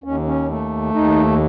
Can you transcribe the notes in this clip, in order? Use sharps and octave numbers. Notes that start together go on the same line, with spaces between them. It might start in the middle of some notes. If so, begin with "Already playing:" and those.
D#2 C#4
C#4
A3
D#2 D#4